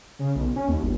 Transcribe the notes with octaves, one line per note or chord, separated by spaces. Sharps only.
C#3
B1
C#4
D#2
G1